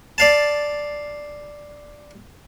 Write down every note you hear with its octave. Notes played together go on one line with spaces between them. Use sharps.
D5 F5 A5